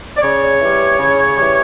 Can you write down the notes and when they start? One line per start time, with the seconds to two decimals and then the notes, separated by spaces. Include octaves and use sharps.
0.16 D5
0.22 C#3 C#5
0.60 E3 G3
0.98 C#3
1.36 E3 G3